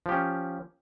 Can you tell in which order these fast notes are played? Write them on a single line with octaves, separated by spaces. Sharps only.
F3 G4 C#4